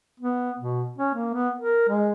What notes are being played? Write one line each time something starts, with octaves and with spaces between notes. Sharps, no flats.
B3
B2
C#4
A#3
B3
A#4
G#3